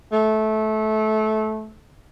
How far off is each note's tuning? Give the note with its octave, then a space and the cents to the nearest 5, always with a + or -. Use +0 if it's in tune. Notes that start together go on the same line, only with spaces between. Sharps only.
A3 -20